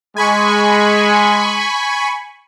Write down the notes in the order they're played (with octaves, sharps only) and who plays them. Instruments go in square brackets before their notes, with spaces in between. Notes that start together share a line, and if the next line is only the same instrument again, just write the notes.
[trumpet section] G#3 [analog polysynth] G#5 B5 C#6